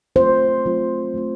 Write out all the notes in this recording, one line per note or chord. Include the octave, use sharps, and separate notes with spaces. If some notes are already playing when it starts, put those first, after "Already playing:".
F#3 A3 C4 F4 C5
F#3 A3 C4 F4
F#3 A3 C4 F4